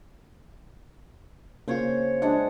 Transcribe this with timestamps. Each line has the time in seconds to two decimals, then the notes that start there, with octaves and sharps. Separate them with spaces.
1.68 C#3 A#3 F4 C5 C#5
2.22 G#3 D4 F#5